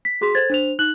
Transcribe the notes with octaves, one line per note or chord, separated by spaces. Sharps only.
B6
F#4 G#4 C6 B6
A4 C5 G#6 A6
D4 C5 F7
D#4 F#6 F#7